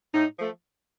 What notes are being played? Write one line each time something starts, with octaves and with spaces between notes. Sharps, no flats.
A2 D#4
F3 A3